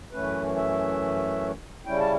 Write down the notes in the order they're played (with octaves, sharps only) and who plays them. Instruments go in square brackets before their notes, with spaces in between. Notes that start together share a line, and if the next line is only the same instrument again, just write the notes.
[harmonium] F#2 E3 A3 C#4 B4
E5
C#3 G3 C#4 E4 G5
A5